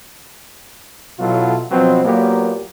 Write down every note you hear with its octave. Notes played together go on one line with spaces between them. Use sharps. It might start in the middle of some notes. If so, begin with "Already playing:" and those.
B1 B2 F#3 E4 F4 A4
B2 F3 F#3 B3 C4
A#2 F#3 A#3 B3 G4 A#4